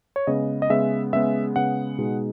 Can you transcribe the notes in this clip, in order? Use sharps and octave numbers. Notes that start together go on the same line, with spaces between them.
C#5
C#3 G#3 B3 D#5
D#5
C#3 G#3 B3 E5
C#3 G#3 B3 E5
C#3 G#3 B3 F#5
B2 G#3 D#4